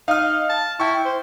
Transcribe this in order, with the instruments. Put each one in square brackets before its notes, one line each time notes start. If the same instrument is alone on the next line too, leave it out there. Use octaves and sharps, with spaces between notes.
[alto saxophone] D#4 [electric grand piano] F5 F6
[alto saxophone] A5
[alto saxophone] E4 [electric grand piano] G5 C#6
[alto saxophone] C5